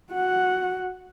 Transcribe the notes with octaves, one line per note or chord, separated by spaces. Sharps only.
F#4 F#5